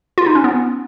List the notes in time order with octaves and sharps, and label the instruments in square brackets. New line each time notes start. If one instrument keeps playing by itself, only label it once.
[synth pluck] F4
D#4
C#4
B3